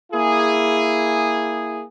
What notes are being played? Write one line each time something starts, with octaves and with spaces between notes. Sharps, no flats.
A#3 E4 G#4